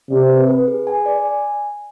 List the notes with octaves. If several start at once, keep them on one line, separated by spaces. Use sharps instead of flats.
C3 D5
B4
B4
G#4
G#5
D5
G#5